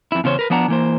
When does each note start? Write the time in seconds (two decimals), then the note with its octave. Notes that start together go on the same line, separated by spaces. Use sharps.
0.12 F2 E4
0.24 E2 C#3 C#4 C5 C#5
0.39 A#4 B4
0.50 F3 B3 D4 F#5 A5 A#5
0.68 E3 A#3 C5